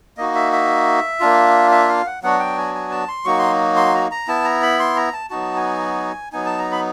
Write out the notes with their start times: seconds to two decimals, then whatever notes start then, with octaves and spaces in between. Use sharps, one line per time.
0.18 A#3 D#4 F#4 D#5
0.35 E5
0.53 E5
1.20 A#3 D4 F4
1.71 E5
1.89 F5
2.06 F#5
2.23 F#3 B3 D4 F#4 F#5
2.39 G5
2.57 G#5
2.75 G#5
2.91 A5
3.08 C6
3.25 F#3 A#3 D#4 F#4 C#6
3.38 C6
3.76 C6
3.94 A#5
4.11 A#5
4.28 B3 E4 A5
4.44 A#5
4.62 B5
4.80 C6
4.96 A#5
5.13 A5
5.30 F#3 B3 D#4 F#4 A5
5.56 G#5
6.32 F#3 B3 D#4 G#5
6.46 A5
6.58 A#5
6.72 B5